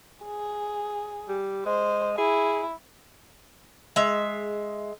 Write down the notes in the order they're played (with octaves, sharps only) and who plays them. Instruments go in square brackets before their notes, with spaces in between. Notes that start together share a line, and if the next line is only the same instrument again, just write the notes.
[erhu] G#4
[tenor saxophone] G3
[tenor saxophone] G#3 [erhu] C5
[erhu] E4 [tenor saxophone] G#4
[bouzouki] G#3 E5